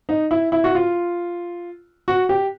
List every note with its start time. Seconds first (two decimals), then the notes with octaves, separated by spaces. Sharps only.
0.09 D#4
0.31 E4
0.52 E4
0.64 F#4
0.75 F4
2.08 F#4
2.29 G4